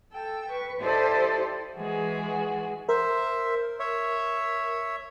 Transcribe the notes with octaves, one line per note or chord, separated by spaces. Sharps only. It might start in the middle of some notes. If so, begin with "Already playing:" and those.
A4 G5 E6
B4 C#6
E4 G4 A4 C5 D5 D#5
E3 G#3 F#4 G#4
A#4 C5 E5
C#5 E5